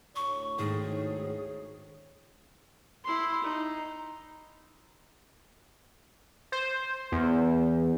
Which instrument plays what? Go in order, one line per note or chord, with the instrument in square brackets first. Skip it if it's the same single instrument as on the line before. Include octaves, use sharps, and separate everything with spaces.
[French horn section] D2 A2 C#5 [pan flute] C#6
[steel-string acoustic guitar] G#2 D#3 A3 [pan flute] G#4
[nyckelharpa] E4 C6
D#4
[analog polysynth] C5
E2